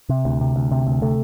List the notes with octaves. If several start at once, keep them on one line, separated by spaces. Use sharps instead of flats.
C3
D2
C3
D2
C3
D2
C3 A3